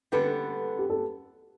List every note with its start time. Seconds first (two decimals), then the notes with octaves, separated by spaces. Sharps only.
0.12 D3 G3 B3 F#4 A4 B4
0.78 G4
0.90 A4